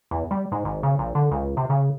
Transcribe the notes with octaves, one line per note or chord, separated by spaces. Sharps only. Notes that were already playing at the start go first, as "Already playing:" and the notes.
E2
G3
G#2
G#1
C#3
A#1
D3
C#2
C3
C#3